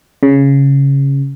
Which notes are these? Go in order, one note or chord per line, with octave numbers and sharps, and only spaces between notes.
C#3